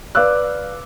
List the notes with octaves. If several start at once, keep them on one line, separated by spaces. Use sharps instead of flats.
B4 D5 F5 D6 E6 F#6